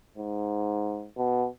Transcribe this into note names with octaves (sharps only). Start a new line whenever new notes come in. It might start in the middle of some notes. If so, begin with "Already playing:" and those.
G#2
B2